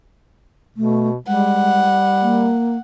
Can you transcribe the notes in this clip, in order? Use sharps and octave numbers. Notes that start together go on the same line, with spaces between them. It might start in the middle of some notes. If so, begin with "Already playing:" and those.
B2 A3
G3 G#3 F#5
A#3